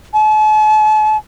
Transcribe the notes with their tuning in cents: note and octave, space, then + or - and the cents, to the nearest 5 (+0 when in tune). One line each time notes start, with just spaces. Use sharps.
A5 -45